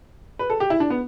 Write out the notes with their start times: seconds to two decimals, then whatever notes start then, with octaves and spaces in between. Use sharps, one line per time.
0.39 B4
0.50 A4
0.60 G4
0.70 E4
0.80 D4
0.90 B3